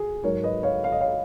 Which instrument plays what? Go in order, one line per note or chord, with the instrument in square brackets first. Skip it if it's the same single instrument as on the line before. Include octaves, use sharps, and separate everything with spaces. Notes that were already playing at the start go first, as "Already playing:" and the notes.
Already playing: [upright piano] G#4
G#2 F#3 A#4 C#5
B4 D#5
C#5 F5
F5
D#5
C#5 F5